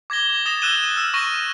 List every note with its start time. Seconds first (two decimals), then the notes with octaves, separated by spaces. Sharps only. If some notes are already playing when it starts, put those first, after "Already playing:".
0.10 D6 G#6 A#6 G7
0.46 D#6 A6 A#6 E7
0.62 E6 F#6 G6 D#7 E7 G7
0.96 E6 F6
1.14 C#6 F6 A#6 D#7 E7